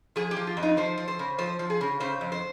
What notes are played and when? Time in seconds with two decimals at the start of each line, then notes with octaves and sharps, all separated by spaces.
0.16 F3 G#4
0.31 G4
0.37 F3
0.47 F4
0.57 F2
0.63 D#4
0.77 F3 C5
0.98 F3
1.08 C5
1.19 C#3
1.38 F3 C5
1.59 F3
1.70 G#4
1.81 C#3
2.00 C#3 C5
2.21 F2
2.32 C5